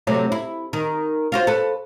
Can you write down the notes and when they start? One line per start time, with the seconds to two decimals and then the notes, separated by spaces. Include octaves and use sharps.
0.07 C3 F#3 A3
0.32 E4
0.73 D#3
1.32 F4 F#4 C5
1.47 A4 B4